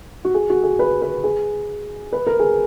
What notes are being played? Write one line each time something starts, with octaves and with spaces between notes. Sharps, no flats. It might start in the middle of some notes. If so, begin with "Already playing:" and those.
F#4
G#4
F#4
G#4
B4
B4
G#4
B4
A#4
G#4